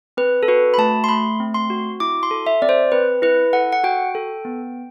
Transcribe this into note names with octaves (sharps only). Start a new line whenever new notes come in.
C4 B4
A4
F#4 B4
B5
A3 A5
C6
A3 B5
C4
C6
F#4
E4 D6
C6
A4
E5
C4 D5
C5
C4 B4
E4 B4
A4 F#5
F#5
F#4 G5
A4
B3